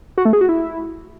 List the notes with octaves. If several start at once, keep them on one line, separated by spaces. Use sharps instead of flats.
F#4
A3
G#4
F#4
E4